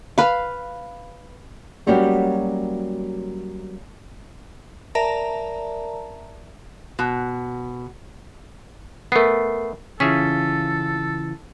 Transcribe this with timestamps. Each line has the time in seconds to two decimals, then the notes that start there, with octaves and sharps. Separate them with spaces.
0.18 B4 F5
1.87 F#3 G3 A#3 C#4 F#4 G4
4.95 A#4 D5 E5 A5 A#5
6.99 B2
9.12 A3 B3 A#4 C7
10.00 C#3 E3 C#4 F4 G#4 A4 E5 B6